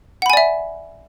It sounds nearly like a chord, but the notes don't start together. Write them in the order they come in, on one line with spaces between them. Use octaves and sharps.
F#5 B5 G#5 D5 E5